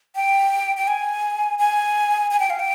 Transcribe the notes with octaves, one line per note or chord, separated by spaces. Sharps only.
G5
G5
G#5
G#5
G#5
G5
F5
G5